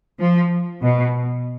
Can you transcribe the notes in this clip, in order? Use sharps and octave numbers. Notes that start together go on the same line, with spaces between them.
F3
B2